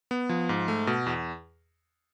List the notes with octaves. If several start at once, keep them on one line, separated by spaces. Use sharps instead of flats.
B3
F3
G#2
A3
B2
E2